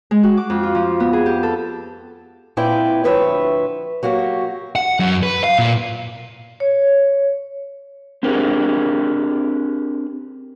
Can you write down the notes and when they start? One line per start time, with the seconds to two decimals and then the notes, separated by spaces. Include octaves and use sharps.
0.11 G#3
0.23 F#4
0.37 D6
0.50 F2
0.63 F4
0.75 F3
1.00 B3
1.13 G#4
1.26 G4
1.43 A4
2.57 A#2 C4 E4 B4 D5 G5
3.04 D2 F3 B4 C#5 E5
4.03 F#3 A#3 F#4 G4
4.76 F#5
5.00 F#2
5.23 B4
5.44 F5
5.59 A#2
6.60 C#5
8.23 C4 D4 G4 G#4 A#4